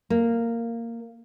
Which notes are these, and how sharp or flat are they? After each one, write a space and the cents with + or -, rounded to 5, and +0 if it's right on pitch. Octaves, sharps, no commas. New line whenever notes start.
A#3 -10